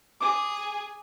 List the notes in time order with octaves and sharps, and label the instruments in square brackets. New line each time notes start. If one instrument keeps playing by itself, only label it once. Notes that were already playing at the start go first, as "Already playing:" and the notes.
[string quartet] G#4 [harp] D6